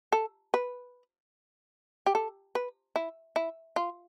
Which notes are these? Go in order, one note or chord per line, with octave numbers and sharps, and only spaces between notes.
A4
B4
G4
A4
B4
E4
E4
F4